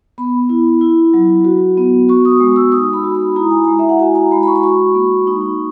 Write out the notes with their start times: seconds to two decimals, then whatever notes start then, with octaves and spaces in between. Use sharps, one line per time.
0.18 B3 B5
0.49 E4
0.81 E4
1.14 F#3
1.45 F#4
1.78 B3
2.09 F#4 C#6
2.25 D#6
2.40 G#3
2.56 E6
2.72 D#4 D#6
2.93 B5
3.04 F#4
3.15 B5
3.36 E4 A#5
3.51 G#5
3.64 G#3 A#5
3.79 E5
3.89 F#5
3.99 F#4 G#5
4.15 A#5
4.31 G#3 B5
4.43 B5
4.48 C#6
4.56 B5
4.63 F#4 C#6
4.95 A#3
5.27 D#4